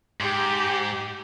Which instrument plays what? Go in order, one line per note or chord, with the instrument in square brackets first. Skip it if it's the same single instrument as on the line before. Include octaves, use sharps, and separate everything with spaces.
[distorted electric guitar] G#2 [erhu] G4